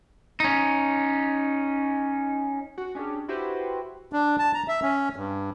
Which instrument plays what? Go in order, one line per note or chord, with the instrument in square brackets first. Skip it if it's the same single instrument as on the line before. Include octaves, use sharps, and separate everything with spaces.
[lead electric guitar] C#4 D#4
[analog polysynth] F#4
C#4 D4 G4 G#4
E4 F#4 G4 B4 C5
[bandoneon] D4
A5
A#5
E5
C#4
G2